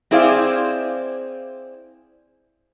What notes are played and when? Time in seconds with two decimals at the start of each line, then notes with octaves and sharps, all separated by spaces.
0.11 C4 E4 G#4 C5 D5 F5